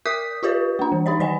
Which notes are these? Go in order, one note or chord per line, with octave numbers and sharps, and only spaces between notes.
A#4 E5 D6 D#6 G6 B6
F4 G4 B4 C#5
A#3 D4
E3
D#4 G4 C#5 D#5
D#3 D5 D#5 G#5